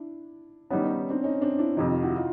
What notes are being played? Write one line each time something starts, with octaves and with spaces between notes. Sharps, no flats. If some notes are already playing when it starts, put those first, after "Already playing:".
Already playing: D4 E4
D#3 G3 B3 C#4 D#4
C#4 D#4
C4 D4
C#4 D#4
C4 D4
D4 E4
F2 C3 D#3 D#4 F4
D#4 F4
E4 F#4
D#4 F4